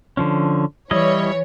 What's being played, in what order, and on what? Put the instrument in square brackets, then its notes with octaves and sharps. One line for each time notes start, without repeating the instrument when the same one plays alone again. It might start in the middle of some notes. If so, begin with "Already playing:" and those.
[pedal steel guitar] D3 F3 C#4
[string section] E3 C#5 [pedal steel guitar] G3 E4 D#5